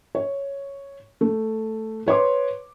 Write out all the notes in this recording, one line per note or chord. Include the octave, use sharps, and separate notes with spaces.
C#5
A3
B4 C#5 C6 D6